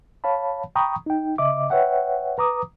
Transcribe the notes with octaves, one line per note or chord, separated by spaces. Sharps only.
C#5 F5 A5 B5
G5 A#5 B5 C#6 D#6
D#4 G5
C#3 D#5 E5 D6
B4 C#5 E5 F#5 G5
B4 A#5 D6 D#6